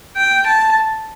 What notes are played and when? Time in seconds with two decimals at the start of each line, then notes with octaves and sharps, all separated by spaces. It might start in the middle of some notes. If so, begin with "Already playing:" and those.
0.17 G5
0.47 A5